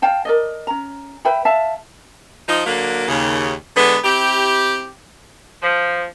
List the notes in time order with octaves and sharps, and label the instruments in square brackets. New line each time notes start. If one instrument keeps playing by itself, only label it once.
[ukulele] F5 G5 A5
A#4 D5 D#5
C#4 A#5
B4 E5 G5 B5
E5 F5 A5
[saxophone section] F3 D#4
D3 F#3 A#3
D#2 C#3
D3 G#3 B3
C4 E4 G4
F3